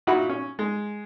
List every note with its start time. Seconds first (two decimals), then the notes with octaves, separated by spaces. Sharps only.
0.07 A#2 D#4 E4 F#4 F#5 B5
0.29 C#4
0.59 G#3